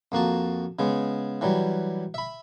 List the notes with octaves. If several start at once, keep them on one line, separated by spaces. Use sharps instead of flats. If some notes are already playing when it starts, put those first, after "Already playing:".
F2 A#3 F#4 A5
C#3 G#3 B3
E3 F#3 G3
E5 B5